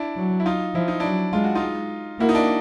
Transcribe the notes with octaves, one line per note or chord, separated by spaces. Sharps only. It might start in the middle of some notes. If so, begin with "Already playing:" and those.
Already playing: D4 E4
F#3
E4
D#4 F4
F3 E4
D#4
F#3 D4 E4
G#3 F4
F#4
D#4 F4
G#3
A#3 E4 F#4
D#4
D4 E4